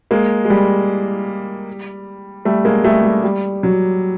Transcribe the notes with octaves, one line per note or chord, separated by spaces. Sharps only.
G#3 A#3
G#3
G3
G3 A3
G#3 A#3
G3 A3
G3
G3
F#3